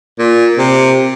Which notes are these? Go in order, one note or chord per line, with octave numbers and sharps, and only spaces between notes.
A#2
C3